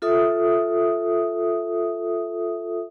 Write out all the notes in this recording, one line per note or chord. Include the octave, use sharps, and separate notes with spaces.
F4 A4 E5 D#6